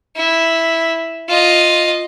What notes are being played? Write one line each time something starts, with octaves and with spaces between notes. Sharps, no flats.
E4
F4 D#5